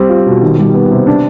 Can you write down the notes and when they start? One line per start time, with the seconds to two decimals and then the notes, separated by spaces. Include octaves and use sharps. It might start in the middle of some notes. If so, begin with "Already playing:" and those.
Already playing: G3 C4
0.09 F4
0.26 B2
0.42 D#3
0.58 G3
0.74 B3
0.91 C3
1.07 D4